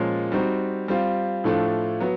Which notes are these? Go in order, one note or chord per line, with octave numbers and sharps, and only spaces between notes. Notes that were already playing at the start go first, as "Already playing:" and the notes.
Already playing: A#2 F3 G#3 C#4
G3 C4 D#4 F#4
G3 C4 F4
A2 F3 A3 D4 F4
F#3 B3